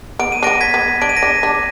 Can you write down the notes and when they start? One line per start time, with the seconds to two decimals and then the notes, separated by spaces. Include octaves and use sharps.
0.19 B3 D7
0.32 D#7
0.43 B3 D4 A#6 D7
0.61 G#6 B6
0.74 B3
1.01 D4 D7
1.09 D#7
1.17 A#6 D7
1.23 D4
1.43 D4